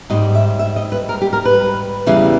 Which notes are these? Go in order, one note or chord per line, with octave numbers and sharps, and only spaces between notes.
G#2 G3 D#5
E5
E5
D#5
B4
A#4
G4
A#4
B4
E2 C#3 E3 G3